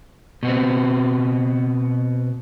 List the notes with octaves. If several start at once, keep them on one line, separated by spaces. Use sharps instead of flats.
B2 B3 C4